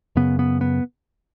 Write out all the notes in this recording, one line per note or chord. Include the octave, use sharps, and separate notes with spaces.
F#2 C#3 B3
B3
B3